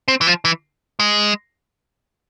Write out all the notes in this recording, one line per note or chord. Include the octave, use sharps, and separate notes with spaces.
C4
E3
F3
E3
G#3